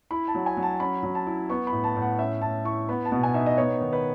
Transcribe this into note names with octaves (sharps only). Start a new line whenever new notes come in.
E4 B5
A5
F#3
G#5
F#3
A5
C#4 B5
F#3
A5
E4
B3 C#6
B5
A2
A5
A2
F#5
C#4 E5
A2 A5
E4 C#6
B3 B5
A5
B2
G#5
D#4 E5
D#5
B3 C#5
D#3
B4